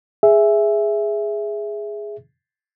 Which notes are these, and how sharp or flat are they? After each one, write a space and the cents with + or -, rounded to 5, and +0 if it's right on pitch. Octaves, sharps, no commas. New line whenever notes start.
G#4 +0 E5 +0